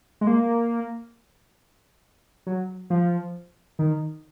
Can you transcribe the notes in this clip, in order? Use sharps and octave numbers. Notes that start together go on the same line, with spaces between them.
G#3
A#3
F#3
F3
D#3